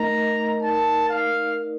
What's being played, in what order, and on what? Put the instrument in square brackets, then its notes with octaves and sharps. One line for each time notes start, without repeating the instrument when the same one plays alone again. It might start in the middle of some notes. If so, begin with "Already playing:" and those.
Already playing: [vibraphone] A3 D#4 A#4 D#5 [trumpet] A#5
[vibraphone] D#4 A#4 D5 [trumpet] A5
[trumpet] F5